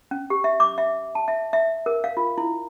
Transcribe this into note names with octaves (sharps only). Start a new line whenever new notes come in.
C#4
G4
E5
D6
E5
A5
E5
E5
A#4
F5
F4
E4